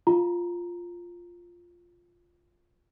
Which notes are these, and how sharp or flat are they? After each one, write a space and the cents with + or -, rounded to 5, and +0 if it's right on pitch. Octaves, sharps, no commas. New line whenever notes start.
F4 +0 A#5 +0